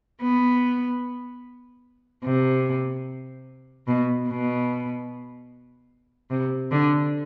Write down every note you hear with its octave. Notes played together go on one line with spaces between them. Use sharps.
B3
C3
B2
B2
C3
D3